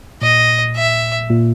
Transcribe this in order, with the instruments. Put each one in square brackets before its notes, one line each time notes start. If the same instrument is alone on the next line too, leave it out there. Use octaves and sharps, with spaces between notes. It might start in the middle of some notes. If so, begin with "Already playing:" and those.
[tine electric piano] A#2 [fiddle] D#5
[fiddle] E5
[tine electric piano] A#2